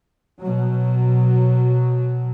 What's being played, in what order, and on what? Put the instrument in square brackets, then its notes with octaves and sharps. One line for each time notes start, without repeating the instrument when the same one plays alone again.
[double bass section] B2 F#3